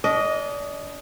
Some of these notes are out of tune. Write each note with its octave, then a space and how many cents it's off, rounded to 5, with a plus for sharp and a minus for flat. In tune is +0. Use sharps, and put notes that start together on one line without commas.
D4 -35 D#5 +0